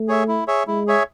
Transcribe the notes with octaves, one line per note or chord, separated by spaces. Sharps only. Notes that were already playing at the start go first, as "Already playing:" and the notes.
Already playing: A3
G#4 C#5 E5
E4
G#4 C#5 E5
G#3 E4
G#4 C#5 E5